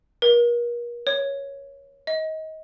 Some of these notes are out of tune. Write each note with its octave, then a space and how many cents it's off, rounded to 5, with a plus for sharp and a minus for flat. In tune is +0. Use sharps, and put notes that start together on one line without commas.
A#4 +40
C#5 +0
D#5 +25